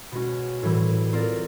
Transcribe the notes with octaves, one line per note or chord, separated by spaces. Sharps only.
B2 G#3 C#4 F#4
A2 E3 G3 C4
C4 F4 A#4 D5